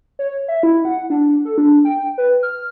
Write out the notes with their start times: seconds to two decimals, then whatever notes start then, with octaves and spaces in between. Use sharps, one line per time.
0.19 C#5
0.48 E5
0.63 E4
0.85 F#5
1.10 D4
1.45 A4
1.58 D4
1.85 G5
2.18 B4
2.43 F6